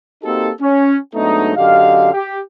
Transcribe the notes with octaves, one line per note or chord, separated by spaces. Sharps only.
A#3 C4 D#4 F#4 G4 A4
C#4
G#2 F#3 A3 B3 D4 D#4
F#2 D3 G4 D#5 F5
G4